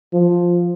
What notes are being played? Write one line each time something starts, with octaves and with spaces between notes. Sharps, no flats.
F3